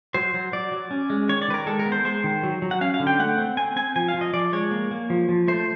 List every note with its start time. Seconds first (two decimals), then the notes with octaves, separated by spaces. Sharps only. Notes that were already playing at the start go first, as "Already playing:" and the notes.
0.14 F#3 C5
0.34 F#3
0.52 F#3 D5
0.72 F#3
0.91 C#4
1.10 G#3
1.29 D#3 C#5
1.42 D5
1.48 D#3 B4
1.54 A#4
1.67 G#3 A4
1.79 A#4
1.86 B3
1.92 C5
2.05 G#3 C5
2.24 D#3
2.43 F#3
2.62 F#3
2.71 F#5
2.81 C#4 F5
2.94 F5
3.00 D3
3.07 G5
3.19 A3 F#5
3.38 C4
3.57 C4 G#5
3.76 C4 G#5
3.96 F3 G#5
4.08 F5
4.14 F3
4.21 D#5
4.34 F3 D5
4.53 G#3 C#5
4.71 A#3
4.91 A#3
5.10 F3
5.29 F3
5.48 A3 C5